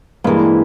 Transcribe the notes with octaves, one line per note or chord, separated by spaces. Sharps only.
G2 E3 G3 G#3 A#3